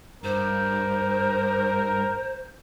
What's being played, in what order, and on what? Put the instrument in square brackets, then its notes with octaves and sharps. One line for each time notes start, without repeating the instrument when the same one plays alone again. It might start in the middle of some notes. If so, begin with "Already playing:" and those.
[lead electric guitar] G2 [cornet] A#4 [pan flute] C5